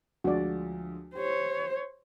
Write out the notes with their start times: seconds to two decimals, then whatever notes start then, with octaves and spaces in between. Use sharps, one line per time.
0.24 D2 F3 G#3 F#4 D5
1.15 G4 C5 C#5